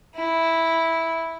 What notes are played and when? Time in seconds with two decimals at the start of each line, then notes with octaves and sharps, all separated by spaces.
0.15 E4